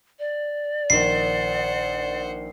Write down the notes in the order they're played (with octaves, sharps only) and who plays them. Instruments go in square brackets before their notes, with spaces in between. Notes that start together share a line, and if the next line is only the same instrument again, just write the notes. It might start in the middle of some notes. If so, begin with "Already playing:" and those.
[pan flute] D5
[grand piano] A#1 D#3 [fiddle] C5 F#5 [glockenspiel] C7